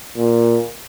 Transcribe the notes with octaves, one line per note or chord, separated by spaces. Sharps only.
A#2